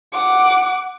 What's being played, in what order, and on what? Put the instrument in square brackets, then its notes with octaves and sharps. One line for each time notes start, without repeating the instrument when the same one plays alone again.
[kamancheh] F#5 D6